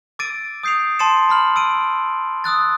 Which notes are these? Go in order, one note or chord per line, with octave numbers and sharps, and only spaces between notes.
D6 E6 A6 D7 D#7
D#6 G6 C7 D7 F7
A5 C6 A6 C#7 E7
A#5 B5 F6 F#7
E6 D7 D#7
D#6 E6 F#6 A6